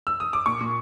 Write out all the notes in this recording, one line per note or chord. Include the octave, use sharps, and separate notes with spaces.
E6
D#6
D6
A#2 C#6
A#2